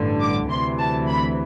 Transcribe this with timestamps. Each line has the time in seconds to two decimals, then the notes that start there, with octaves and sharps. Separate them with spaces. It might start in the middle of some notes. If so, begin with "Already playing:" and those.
Already playing: A1 G2 D3
0.22 D6
0.50 D2 C3 E3 C6
0.80 A5
1.08 B5